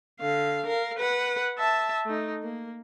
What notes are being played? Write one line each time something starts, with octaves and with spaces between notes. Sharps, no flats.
D3 F5
A#4 F5
B4 F#5
E5 A5
A3 D#4
A#3